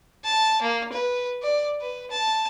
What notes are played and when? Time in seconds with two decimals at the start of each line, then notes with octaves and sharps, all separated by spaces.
0.24 A5
0.62 A#3
0.92 B4
1.43 D5
1.81 B4
2.11 A5